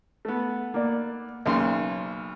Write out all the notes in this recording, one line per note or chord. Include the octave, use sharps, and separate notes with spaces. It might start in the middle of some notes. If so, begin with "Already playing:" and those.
A3 B3
A#3 D5
B1 C#3 A#3 C6